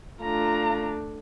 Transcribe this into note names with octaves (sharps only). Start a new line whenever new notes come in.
A3 D4 F4 A#5